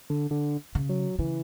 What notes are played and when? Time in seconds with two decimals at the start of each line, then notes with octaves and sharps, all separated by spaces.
0.10 D3
0.31 D3
0.75 C#3
0.89 F#3
1.19 C#3 E3